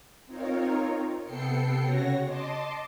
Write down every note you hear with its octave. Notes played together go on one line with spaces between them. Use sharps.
C4 D#4 F4 A#4 C#5
C3 B3 A4 G5 C7 C#7
C#3 F#4 C#5 A#6
D#5 A5 C6 D6